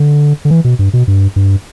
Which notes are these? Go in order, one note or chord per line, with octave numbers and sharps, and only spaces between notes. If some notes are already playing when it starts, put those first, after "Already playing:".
Already playing: D3
D3
E3
B2
G2
B2
G2
G2